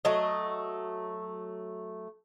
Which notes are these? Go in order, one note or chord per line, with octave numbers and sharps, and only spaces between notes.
F#3 A3 D#5